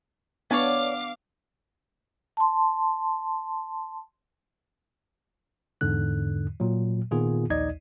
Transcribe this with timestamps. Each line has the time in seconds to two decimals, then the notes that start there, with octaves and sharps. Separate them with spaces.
0.51 B3 D4 C#5 D5 F5 G#5 D6
2.37 A5 C6
5.81 E2 G#2 D3 F#6
6.60 A#2 F#3
7.11 A#2 D#3 B3 F4 G#4
7.50 A#1 D#2 D#4 D5 D#5 G#6